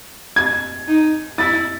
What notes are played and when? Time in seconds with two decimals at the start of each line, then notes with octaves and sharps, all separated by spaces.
0.36 G#6
0.88 D#4
1.38 E4 A6